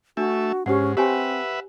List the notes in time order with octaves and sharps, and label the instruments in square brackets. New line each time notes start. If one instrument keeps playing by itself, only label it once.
[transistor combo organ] A3 E5 [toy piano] D4 [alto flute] F#4
[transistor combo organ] G#2 [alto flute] C#4 [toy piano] G4 C5 F#5
[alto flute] C4 [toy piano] G4 C#5 G#5 [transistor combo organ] B4 E5 F#5